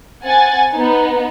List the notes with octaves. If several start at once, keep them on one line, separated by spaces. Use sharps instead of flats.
C4 F#5 G#5 A6
B3 D#4